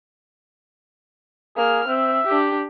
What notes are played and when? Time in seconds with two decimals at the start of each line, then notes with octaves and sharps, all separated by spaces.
1.56 A#3 G#4 F6
1.87 C4 E5
2.27 D4 G4